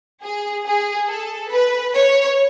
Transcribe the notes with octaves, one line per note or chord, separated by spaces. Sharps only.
G#4
G#4
A4
B4
C#5